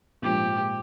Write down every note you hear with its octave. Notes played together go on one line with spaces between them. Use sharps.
A#1 G#2 F3 A#3 G4